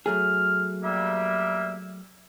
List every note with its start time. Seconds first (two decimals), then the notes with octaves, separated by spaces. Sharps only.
0.06 F#3 A3 G#4 F6
0.83 G3 A#3 E5